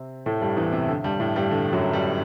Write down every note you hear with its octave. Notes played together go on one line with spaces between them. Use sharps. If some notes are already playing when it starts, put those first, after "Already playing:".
Already playing: C3 C4
A2 A3
G2 G3
E2 E3
C3
D3
G2 G3
A2 A3
G2 G3
D3
F#2 F#3
G2 G3